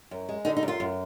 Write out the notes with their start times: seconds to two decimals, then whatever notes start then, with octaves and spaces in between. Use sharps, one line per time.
0.11 F#2
0.29 G#3
0.45 D3 D#4
0.57 D#4
0.63 F#2
0.68 F4
0.80 F#2